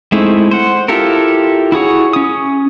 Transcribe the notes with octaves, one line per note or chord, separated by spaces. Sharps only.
G#3 A3 C4 D#4 E4
C5 F#5
E4 F4 G4 A4 A#4
E4 F#4 G#4 C#5
C#4 D#6